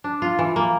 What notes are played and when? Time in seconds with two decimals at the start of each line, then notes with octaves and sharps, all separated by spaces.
0.04 D4
0.22 F4
0.39 E3
0.56 A#3